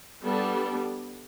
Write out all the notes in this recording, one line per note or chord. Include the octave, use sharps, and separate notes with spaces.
G3 B3 D4 A4